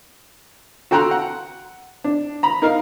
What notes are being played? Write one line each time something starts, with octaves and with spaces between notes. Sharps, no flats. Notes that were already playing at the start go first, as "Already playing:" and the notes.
F#4 A4 G5 A#5 C6 F#6
F#5
D4
A#5 B5
D#4 A#4 F5